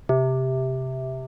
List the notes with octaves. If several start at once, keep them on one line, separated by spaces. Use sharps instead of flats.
C3